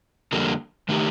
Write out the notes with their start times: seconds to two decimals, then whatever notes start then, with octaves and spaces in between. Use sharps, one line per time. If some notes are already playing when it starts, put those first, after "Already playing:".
0.32 F2 D3 G3 A#3
0.89 D#3 A3 D#4 G4